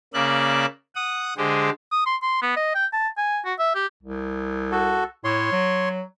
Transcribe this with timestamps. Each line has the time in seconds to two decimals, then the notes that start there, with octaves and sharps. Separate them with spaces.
0.14 C#3 A#3 D5 E5 F#6
0.95 F#5 D#6
1.37 D3 G#3 G4 G#4 C5
1.92 D#6
2.06 C6
2.22 C6
2.42 B3
2.56 D#5
2.75 G5
2.93 A5
3.17 G#5
3.45 F#4
3.59 E5
3.75 G4
4.03 C2
4.72 F#4 A4
5.24 A2 C#5 C6
5.52 F#3